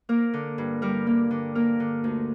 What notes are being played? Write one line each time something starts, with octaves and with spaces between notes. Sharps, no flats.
A#3 A#4
D3
G2
G3 A#4
A#3
D3
A#3 A#4
D3
D2